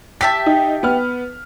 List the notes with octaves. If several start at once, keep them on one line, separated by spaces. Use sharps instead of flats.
G4 E5 A5 B6
D#4
B3 F6